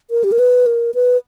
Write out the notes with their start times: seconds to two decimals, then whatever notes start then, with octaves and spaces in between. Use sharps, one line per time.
0.11 A#4
0.24 G4
0.32 A#4
0.39 B4
0.66 A#4
0.95 B4